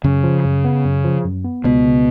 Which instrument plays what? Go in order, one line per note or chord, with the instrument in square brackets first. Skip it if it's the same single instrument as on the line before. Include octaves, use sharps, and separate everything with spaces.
[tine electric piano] F#2 [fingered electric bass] C#3 C#4
[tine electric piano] F3
F#2
B3
F#2
F3
F#2
B3
[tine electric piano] C#2 [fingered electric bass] B2 B3
[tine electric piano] C#3